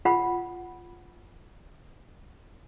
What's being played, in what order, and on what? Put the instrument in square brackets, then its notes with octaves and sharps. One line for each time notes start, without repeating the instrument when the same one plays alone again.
[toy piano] F4 F#5 B5